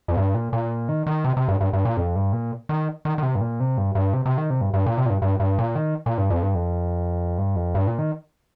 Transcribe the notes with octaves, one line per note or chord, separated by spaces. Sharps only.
F2
G2
A#2
A#2
D#3
D#3
C3
C3
G2
G2
G2
A#2
F2
G2
A#2
D#3
D#3
D#3
C3
G2
A#2
C3
G2
G2
C3
C3
D#3
C3
G2
G2
A#2
C3
A#2
G2
G2
G2
A#2
D#3
A#2
G2
F2
G2
F2
G2
F2
G2
A#2
D#3